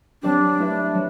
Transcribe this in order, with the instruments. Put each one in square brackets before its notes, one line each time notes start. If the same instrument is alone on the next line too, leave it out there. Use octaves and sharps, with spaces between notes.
[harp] F#3 C4 G4 D5 [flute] D4
[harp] A3 E4 B4 E5
F#3